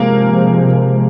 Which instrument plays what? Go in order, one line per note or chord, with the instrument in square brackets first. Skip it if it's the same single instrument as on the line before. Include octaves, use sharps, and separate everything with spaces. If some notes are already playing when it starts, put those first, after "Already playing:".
Already playing: [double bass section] C3 F3 G#3 [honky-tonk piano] A#3